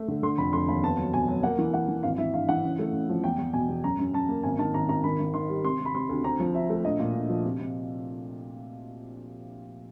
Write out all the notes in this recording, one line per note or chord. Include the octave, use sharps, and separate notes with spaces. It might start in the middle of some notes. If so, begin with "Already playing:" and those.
Already playing: A3
D3
D3 C6
F1 B5
F1 C6
D#2 B5
B3 A5
F#3
B2 G#5
F#3
A#3 F#5
E3
E3 F#5
E3
G#1 F5
E3 E5
G2 F5
E3 F#5
C#3
A3
C#3
F3
E2 G5
E2
B2 G#5
E2
F#2 A#5
F#2
F#2 A5
A#3
G#1 G#5
D#3 A5
G#1 A#5
G#1 A#5
D#3 B5
D#3
D#3 C6
G3
C3 C6
C3
B5
C3 C6
D2
C4 A#5
F3
C4 E5
A3
A#1 D#5
A#2
A#1
F3
C3
C3